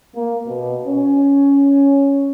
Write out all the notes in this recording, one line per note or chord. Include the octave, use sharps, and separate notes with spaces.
A#3
B2
C#4